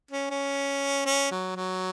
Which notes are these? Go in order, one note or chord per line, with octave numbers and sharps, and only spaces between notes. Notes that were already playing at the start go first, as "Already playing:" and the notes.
C#4
C#4
C#4
F#3
F#3